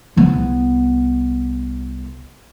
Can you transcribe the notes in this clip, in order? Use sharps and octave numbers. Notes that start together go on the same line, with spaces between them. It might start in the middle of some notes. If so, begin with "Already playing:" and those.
C2 B3